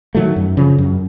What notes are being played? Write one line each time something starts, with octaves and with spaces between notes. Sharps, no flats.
D#3 F#3 A3
F#2
C#3 F3
F#2